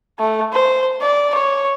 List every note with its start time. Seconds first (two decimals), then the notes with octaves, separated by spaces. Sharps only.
0.19 A3
0.53 C5
1.01 D5
1.35 C#5